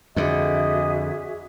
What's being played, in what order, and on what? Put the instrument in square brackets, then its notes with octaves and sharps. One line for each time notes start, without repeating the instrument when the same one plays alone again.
[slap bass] F2 D3 [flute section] F#4 G#4 E5 [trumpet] D#5